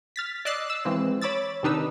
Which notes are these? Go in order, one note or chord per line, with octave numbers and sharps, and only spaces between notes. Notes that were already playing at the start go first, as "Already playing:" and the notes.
F6 A6 B6
D5 D#5 E6 F#6 A6 C7
E6
E3 F3 G#3 C4
C#5 B5 D6 E6 A6
C3 D#3 D4 D#4 B4 E6